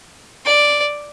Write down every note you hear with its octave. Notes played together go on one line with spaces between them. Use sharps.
D5